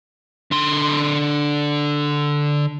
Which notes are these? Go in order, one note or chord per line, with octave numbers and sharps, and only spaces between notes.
D3 C6